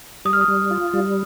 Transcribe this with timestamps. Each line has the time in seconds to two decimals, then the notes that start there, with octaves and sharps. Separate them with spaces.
0.25 G3 D#6
0.33 F6
0.41 D#6
0.48 G3
0.71 F4
0.93 G3